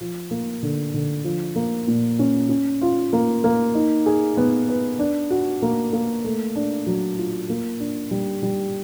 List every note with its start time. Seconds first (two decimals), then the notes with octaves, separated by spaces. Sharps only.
0.01 F3
0.31 A#3
0.63 D3
0.94 D3
1.24 F3
1.56 A#3
1.87 A#2
2.19 C#4
2.49 C#4
2.81 F4
3.13 A#3
3.44 A#3
3.74 D#4
4.06 G#4
4.37 B3
4.69 B4
4.99 D4
5.30 F#4
5.62 A#3
5.93 A#3
6.24 A3
6.55 D4
6.86 F#3
7.18 F4
7.49 A#3
7.80 D4
8.11 G3
8.43 G3